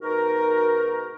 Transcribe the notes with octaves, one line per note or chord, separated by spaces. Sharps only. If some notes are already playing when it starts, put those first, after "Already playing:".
G#2 B2 D#4 F#4 A#4